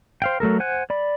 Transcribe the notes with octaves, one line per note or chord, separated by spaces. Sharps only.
C5 F5 G5
F#3 A3 A4 A#4
C5 F#5 G#5 F#6
D5 B5